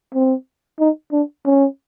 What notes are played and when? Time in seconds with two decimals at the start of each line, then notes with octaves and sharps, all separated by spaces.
0.14 C4
0.80 D#4
1.12 D4
1.46 C#4